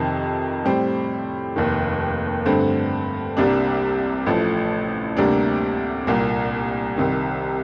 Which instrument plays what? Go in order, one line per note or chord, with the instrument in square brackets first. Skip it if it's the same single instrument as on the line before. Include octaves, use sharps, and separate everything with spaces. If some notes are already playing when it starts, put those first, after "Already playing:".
Already playing: [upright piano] F2 C3 D#3
A2 G3 C4
F1 D#2 D#3
G2 D3 A3 C4
C2 C3 G3 A#3 D4
A1 A2 F3 A3
D2 C3 G3 A#3 D4
C2 A#2 G3 A#3
C2 C3 D#3